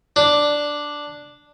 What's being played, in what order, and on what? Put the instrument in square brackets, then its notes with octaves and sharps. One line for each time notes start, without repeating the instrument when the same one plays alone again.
[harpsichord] D4